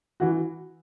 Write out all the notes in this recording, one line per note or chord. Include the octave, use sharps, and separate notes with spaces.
E3 F#4